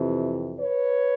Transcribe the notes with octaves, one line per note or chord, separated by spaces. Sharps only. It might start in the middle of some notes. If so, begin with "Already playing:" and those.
Already playing: F2 C3 E3
B4 C#5